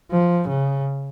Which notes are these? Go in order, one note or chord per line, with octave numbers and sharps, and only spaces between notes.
F3
C#3